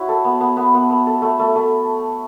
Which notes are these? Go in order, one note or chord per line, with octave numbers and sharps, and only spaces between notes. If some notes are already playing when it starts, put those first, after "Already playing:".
Already playing: E4 F#4 C#5
A4
B3
B3
B3
B3
B3
A4
A3
A3
A3